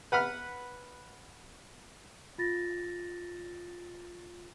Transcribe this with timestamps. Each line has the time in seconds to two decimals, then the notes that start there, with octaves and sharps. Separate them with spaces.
0.12 B4 F#5 B5 F6
2.38 F4 A6 A#6